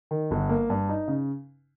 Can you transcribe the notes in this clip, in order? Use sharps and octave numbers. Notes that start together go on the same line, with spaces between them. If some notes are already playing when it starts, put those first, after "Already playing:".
D#3
G1
A#3
G2
D#4
C#3